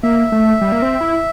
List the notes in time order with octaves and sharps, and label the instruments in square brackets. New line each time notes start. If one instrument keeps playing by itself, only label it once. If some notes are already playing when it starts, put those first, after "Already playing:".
[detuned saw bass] A#3 [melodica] E5
[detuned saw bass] A3
G3
A#3
C4
E4